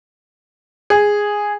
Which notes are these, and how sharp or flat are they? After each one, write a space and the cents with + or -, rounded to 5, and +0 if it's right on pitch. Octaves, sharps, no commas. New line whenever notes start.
G#4 -5